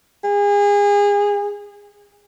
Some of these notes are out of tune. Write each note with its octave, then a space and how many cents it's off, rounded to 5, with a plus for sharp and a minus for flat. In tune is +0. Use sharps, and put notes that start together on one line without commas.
G#4 -30